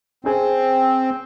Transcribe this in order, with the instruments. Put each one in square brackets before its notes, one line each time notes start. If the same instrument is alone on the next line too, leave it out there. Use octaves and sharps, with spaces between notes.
[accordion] C4 [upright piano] C#4 G#4